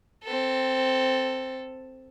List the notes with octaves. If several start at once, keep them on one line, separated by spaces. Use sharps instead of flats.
C4 A4